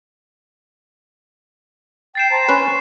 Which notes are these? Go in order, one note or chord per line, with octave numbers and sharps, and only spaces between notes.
G5 A6 C7 E7
C5 A5 A#5
C#4 B4 G#5 C6
C#6